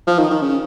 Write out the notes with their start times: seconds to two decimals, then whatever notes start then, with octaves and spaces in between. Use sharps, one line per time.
0.07 F3
0.19 D#3
0.30 D#3
0.42 C#3